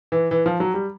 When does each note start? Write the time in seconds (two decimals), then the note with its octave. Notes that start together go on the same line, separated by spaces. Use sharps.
0.12 E3
0.31 E3
0.46 F3
0.60 F#3
0.74 G3